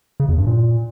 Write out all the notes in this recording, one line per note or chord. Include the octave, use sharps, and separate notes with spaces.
C#3
E2
G2
A#2